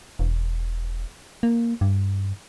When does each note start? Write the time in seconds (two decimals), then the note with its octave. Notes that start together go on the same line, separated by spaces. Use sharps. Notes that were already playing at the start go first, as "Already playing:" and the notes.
0.19 E1
1.43 A#3
1.81 G2